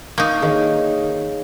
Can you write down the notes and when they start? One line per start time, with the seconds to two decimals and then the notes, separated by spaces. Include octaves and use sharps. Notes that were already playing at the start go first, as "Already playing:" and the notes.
0.18 A#3 D#4 F5 C#6
0.42 D#3 G#4 C#5 F5